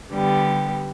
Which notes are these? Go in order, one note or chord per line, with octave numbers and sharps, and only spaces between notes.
D3 G3 B3 G4